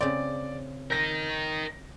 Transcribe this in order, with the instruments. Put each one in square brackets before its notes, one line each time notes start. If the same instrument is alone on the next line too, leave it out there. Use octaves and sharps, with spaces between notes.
[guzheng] C#3 C4 [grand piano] D5
[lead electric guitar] D#4 A#4 [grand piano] G6 A#6